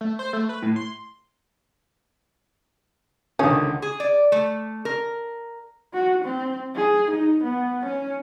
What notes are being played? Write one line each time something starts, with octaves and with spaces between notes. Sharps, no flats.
A3
C5
A3
B4
A2
C6
C#2 D3 D#3 C#4 G#4
G#4
D5
A3
A#4
F#4
C4
G#4
D#4
B3
C#4